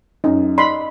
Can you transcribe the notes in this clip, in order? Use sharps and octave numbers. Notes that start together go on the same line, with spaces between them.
F#2 D#4
D5 D#5 B5 C6